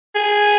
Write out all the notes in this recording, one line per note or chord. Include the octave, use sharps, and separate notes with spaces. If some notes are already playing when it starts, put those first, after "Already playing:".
G#4